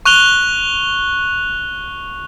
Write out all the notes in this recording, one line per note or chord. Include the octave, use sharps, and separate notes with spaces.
C#6 F#6 F7 G7